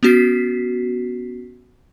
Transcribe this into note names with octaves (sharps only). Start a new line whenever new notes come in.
B3 C#4 F#4 B6 C7